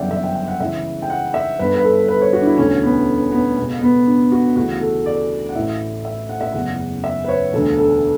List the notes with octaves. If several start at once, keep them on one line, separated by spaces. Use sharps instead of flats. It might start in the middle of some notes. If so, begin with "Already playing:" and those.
Already playing: G1 F#2 C#3 E3 D5 E5 F#5 G5
E5
G5
G5
F#5
C#2 C#3 E3 E5
G5
F#5
E5
G1 G2 D3 B4
B4
A4
B4
C#5
F#4
D4
E4
E1 D2 D3 C#4
B3
B3
C#2 B2
B3
D4
F#4
D2 C#3 E3 F#4
A4
D5
F#5
A1 A2 E3 E5
E5
F#5
E5
F#1 E2 C#3 F#5
E5
B4
C#5
E1 D2 D3 A4
A4